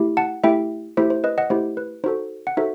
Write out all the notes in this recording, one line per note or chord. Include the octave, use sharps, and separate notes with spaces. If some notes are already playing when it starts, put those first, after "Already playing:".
Already playing: A3 E4 G4
F#5 A5
A3 E4 G4 E5 G5
A3 E4 G4 C5 E5
C5
B4 D#5
D#5 F#5
A3 E4 G4 C5
B4
D#4 F#4 A4 C5
F#5
D#4 F#4 A4 C5 E5